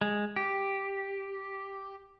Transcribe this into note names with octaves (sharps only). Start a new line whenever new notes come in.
G#3
G4